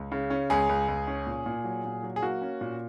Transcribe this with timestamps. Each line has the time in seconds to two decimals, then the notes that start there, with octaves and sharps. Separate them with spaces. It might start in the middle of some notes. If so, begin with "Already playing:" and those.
Already playing: C#2
0.12 C#3
0.30 C#4
0.50 C#2 G#4
0.69 C#2
0.88 C#2
1.07 C#4
1.27 A#2
1.46 A#2
1.64 F#3
1.85 A#2
2.03 F#3
2.16 G#4
2.22 A#3 F#4
2.42 C#4
2.61 A#2